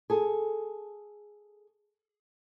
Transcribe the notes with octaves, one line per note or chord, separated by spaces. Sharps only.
G#4 A4